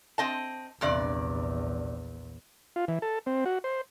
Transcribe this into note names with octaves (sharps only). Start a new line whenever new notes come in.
C4 D#5 A5
A#1 E2 G2 C3 D5
F4
E3
A4
C4
F#4
C5